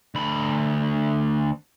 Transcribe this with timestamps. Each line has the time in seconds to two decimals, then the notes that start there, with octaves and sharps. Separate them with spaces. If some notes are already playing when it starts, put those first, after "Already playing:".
0.15 D2 B5